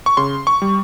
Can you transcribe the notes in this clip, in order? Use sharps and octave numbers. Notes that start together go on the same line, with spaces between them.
C#6
C#3 C6
C#6
G3